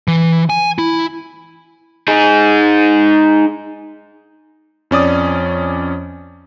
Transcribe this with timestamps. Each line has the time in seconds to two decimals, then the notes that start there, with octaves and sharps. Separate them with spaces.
0.08 E3
0.50 G#5
0.78 E4
2.08 D#4 G#4
4.91 F2 C#4 D5 D#6